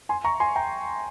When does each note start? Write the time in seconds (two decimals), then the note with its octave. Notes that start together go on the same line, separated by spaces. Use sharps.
0.09 G#5 C6
0.25 A#5 C#6
0.40 G#5 C6
0.56 G5 A#5